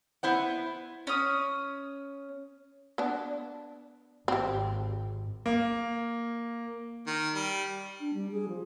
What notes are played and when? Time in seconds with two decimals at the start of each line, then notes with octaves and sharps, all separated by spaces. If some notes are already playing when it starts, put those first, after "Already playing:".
0.23 B3 E4 C5 F#5
1.07 C#4 D#6
2.98 B3 D4
4.28 G#1 C4 G4
5.46 A#3
7.07 D#3
7.35 G3
8.00 D4
8.14 G3
8.32 G#4
8.49 F3